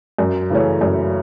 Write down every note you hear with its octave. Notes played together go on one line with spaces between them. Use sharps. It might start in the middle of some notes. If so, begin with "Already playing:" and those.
F#2
C#3 E3 A3 C#4
F#2